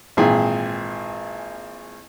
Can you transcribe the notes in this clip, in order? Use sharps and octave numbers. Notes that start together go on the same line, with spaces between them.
G#1 A#2 E3 G#4 G5